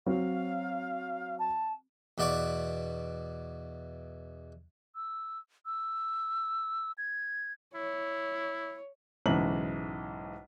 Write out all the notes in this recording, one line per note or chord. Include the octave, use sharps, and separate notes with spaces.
F#3 C4 F5
A5
E2 B2 D5 F#5 C#6 D6
E6
E6
G#6
E4 C#5
B1 G#2 C#3 E3 F#7